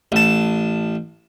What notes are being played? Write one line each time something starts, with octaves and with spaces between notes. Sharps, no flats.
A1 A5